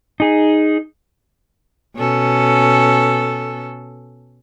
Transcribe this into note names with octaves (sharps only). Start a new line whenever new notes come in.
D#4 G#4
B2 C#4 A4